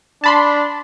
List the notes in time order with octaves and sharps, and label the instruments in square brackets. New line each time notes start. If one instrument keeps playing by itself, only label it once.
[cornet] D4 [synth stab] A5 B5 C6